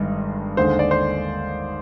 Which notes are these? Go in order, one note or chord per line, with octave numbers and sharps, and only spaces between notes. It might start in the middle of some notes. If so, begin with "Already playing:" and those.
Already playing: G1 G2 D#3 G#3
D#2 D3 G#3 C5
D5
C5